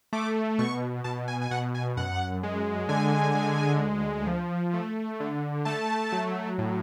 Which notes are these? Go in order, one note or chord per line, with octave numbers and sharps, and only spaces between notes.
A3 D6
B2 C#6
B2 A5
G#5
G#5
B2 F#5
G#5
F#2 F#5
G#3
D3 G#5
G#3
D2
F3
A3
D3
A3 A5
F#3
A2